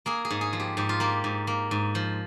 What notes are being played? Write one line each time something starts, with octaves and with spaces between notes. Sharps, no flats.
A#3 G#4
G#4
G#2
G#4
F3
G4
G#2 G4
F4
A#3 G4
G#2
A#3
G#2
F3